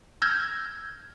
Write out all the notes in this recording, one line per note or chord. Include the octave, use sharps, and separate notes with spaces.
E6 F6 G6 G#6 A#6